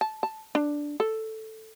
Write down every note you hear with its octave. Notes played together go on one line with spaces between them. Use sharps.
A5
A5
D4
A4